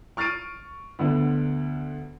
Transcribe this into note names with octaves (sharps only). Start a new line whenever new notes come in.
C#6 F6 A6 C7 D7 D#7
D2 D3 B3